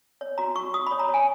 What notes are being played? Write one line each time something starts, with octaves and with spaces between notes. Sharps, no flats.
C#5
F#4 A#5
F#4 C#6
F#4 D#6
C#5 B5
A#5
C#5
G#5